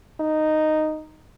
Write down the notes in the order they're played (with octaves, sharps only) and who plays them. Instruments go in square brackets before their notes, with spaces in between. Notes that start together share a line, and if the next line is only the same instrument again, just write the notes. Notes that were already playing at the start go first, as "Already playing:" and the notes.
[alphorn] D#4